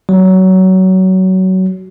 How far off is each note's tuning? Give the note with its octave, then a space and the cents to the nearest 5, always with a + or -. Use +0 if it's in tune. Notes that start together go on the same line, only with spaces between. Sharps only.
F#3 +20